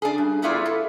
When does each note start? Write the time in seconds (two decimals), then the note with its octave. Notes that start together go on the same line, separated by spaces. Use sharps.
0.02 D4 G#4
0.18 G2
0.42 A3 B3 E4 F4 G#4 D5
0.66 A4